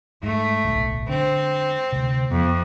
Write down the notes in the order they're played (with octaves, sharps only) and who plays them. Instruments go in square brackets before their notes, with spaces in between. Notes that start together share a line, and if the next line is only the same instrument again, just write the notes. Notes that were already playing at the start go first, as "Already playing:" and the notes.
[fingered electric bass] G#2 [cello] A3
[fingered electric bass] D1 B1
[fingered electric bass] D3 [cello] C4
[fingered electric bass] D2 C3
[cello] F2 [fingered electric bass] B3